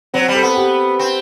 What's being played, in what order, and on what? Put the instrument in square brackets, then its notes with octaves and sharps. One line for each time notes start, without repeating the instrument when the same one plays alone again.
[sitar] F#3 [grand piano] C4
[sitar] G3
[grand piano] A4
[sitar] B3
[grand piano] G4
[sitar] C4